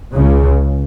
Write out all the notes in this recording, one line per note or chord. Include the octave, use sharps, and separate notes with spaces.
C#2 C#3